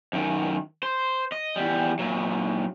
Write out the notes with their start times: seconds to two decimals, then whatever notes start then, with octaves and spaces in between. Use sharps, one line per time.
0.13 F#2 D#3
0.83 C5
1.32 D#5
1.56 E2 G3
1.99 A#2 F#3